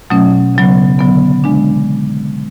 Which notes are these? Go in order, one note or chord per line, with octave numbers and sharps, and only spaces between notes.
B2 F#3 A3 C#4
C#3 F#3 B3
D3 F#3 B3
D3 G#3 D4